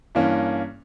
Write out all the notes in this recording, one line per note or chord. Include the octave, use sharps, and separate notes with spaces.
G2 E3 A#3 C#4